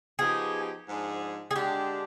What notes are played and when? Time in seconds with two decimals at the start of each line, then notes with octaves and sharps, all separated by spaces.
0.19 F3 B3 D#4 G4 G#4
0.88 G#2 F3 G#3 D4 G#4
1.51 G#4
1.55 D3 G#3 D4 G4